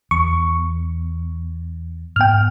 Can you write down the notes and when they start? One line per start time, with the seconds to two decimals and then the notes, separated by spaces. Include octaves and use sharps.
0.11 E2 C#6
2.16 G#2 B3 G5 F6